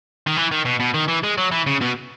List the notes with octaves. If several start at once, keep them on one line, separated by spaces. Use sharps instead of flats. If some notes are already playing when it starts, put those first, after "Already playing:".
D#3
E3
D#3
B2
B2
D#3
E3
G#3
F#3
E3
C#3
B2